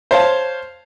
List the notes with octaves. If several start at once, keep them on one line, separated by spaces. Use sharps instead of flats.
C5 C#5 F5 A5